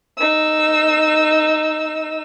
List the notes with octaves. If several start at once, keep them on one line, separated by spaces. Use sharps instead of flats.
D#4 E6